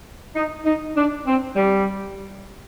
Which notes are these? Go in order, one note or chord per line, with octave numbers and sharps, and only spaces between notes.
D#4
D#4
D4
C4
G3